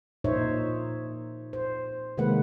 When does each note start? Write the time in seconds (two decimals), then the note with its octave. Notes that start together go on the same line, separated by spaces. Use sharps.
0.24 A#2 D#4 C5 C#5 E5
1.53 C5
2.17 C3 D#3 G#3 A#3 B4 F#5